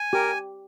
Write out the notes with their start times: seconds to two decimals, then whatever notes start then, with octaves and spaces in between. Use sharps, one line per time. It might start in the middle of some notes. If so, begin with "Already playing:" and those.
Already playing: G#5
0.13 G4 A#4